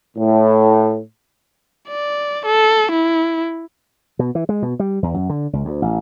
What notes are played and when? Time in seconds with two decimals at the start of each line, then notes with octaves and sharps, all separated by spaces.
0.17 A2
1.88 D5
2.46 A4
2.92 E4
4.19 B2
4.35 E3
4.49 G#3
4.62 B2
4.80 G3
5.03 E2
5.14 F#2
5.29 D3
5.53 C#2
5.65 D2
5.82 A1